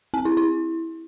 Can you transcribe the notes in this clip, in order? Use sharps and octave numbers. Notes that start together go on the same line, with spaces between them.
C4
E4
E4